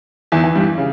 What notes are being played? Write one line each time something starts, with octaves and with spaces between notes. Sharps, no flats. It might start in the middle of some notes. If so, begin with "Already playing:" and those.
E2 E3
E3
G2 G3
C#3